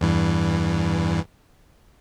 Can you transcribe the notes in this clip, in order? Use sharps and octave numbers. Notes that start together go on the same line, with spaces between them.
E2 G2 E3